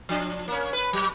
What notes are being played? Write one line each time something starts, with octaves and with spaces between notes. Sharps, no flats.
F3 D4
A#3 C#4
B4
F#3